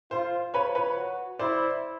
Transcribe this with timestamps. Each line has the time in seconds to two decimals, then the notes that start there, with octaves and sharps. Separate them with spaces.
0.11 F4 C5
0.54 F4 B4 C#5
0.75 B4 C#5
0.96 F#4
1.39 E4 C5 D5